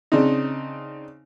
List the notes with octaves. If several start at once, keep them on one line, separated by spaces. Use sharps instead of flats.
C#3 C4 D4 D#4